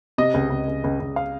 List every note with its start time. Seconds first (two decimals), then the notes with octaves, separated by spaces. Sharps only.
0.18 C3 D#5
0.34 C#2
0.50 C#2
0.68 C#2
0.84 C#2
1.00 C#2
1.16 F5